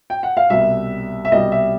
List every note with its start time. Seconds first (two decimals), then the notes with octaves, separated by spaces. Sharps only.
0.10 G5
0.23 F#5
0.37 F5
0.50 C2 B2 G3 E5
1.25 E5
1.31 C2 B2 G3 D#5
1.52 E5